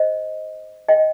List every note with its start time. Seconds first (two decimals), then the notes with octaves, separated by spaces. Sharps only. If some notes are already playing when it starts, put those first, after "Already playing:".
Already playing: C5 D#5
0.88 D#5 G5